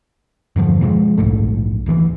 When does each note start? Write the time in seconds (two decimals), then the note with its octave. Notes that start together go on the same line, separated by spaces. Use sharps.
0.56 E2 G2 D3 F3
0.81 B2 F3 G3 G#3
1.18 D1 A#1 G#2 A3
1.86 D1 D#2 D#3 E3